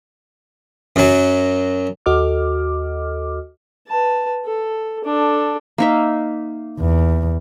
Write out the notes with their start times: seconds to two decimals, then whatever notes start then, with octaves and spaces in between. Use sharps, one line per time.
0.96 F#2 F#3
2.06 D#2 F#4 A4 D#5 D6 F6
3.88 B4 A5
4.45 A4
5.05 D4 A4
5.78 A#3 D#4 E5
6.80 E2